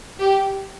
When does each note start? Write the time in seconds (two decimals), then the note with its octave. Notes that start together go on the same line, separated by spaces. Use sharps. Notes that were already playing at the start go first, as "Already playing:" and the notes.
0.19 G4